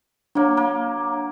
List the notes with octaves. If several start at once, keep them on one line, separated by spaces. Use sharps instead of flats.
F#3 A#3 D4 C#5
A#3